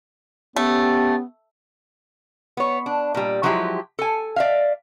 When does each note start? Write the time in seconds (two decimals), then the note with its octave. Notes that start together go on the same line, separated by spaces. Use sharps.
0.56 A3 B3 C#4 G4
2.57 B3 C#5
2.86 D4
3.15 A#2 G3
3.43 F3 F#3 G#3 E4 G4
3.99 A4 G#5
4.36 D5 E5 F5